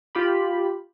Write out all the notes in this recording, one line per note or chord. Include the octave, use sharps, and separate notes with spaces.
F4 G4 B5